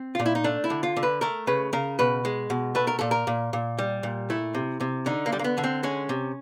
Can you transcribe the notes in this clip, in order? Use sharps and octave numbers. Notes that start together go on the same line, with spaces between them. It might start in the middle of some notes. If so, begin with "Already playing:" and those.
Already playing: C4
A#2 F4
E4
D#4
A3 D4
E4
D3
F4
D3
B4
A3 A#4
C#3 B4
C#3 A#4
B2 B4
G#3
B2
A3 B4
A#4
A#2 A4
A#4
A#2
A#2
G3
A#2
A3 E4
C3
C3
D3 D#4
A#3
G3
A#3
B3
D3
C4
G#3 C#4
C3